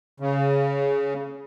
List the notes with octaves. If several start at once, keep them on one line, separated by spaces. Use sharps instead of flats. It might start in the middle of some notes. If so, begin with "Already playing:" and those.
C#3